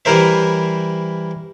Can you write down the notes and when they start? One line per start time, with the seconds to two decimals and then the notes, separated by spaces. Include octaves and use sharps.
0.05 E3 G3 E4 A#4 C5 E5